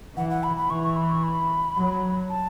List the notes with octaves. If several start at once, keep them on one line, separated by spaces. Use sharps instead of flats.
E3 F#5
F#5
B5
B5
E3 C#6
C#6
B5
C#6
B5
F#3
A5